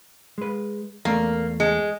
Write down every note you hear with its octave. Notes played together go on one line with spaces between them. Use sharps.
G#3 B4
E2 A3 A#3 D5
G#3